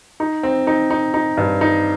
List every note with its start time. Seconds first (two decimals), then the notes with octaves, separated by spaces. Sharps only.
0.20 D#4
0.43 C4
0.67 D#4
0.90 D#4
1.14 D#4
1.37 G2
1.61 D#4